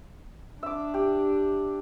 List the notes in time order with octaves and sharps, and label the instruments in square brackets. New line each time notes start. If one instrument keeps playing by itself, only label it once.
[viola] D4 [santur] E5 D6
[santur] G4